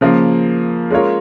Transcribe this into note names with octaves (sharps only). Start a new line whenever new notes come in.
C#3 F3 A#3
G#3 C#4 F4 A#4 C#5